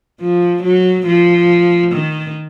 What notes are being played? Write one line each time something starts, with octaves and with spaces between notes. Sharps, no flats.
F3
F#3
F3
D#3